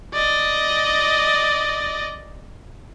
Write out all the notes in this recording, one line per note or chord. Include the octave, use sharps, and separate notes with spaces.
D5 D#5